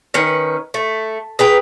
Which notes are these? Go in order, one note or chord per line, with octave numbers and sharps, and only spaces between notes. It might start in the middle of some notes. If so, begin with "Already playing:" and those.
D#3 C#4 B4
A3
G#4 B4 G5 A#5